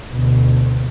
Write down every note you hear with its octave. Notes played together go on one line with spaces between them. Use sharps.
D2 B2